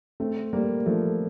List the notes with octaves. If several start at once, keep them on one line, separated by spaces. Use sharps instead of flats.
A3 C4
G3 A#3
F3 A3